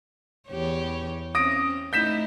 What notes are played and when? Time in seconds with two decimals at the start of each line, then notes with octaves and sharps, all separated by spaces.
0.50 E2 G4 C#5
1.35 C4 C#4 D#6 A#6 D7
1.93 A3 D#4 E4 G6 B6 E7